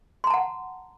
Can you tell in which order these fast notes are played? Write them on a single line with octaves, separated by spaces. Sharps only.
C6 A#5 A5 F#5